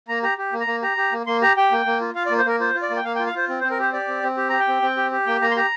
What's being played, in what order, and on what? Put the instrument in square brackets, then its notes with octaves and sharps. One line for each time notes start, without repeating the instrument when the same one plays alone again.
[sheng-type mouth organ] A#3 A#5
G4 A#5
G4
A#3
A#5
A#3
G4 A#5
G4
A#3
A#3 C6
G4 A#5
G4 G5
A#3
A#3
F4
F4 F5
D5
A#3
C5
A#3 A#4
F4 C5
F4
D5
A#3
G5
A#3 F5
G5
F4
F5
F4 C5
C4
C5
C4
A#4
G4 C5
G4 D5
C4
C4
G4
G4 A#5
G5
C4
C4
G4
G4
A#3 G5
A#3 A#5
C6
G4 A#5